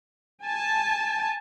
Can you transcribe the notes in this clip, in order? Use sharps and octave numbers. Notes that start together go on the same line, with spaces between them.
G#5 A5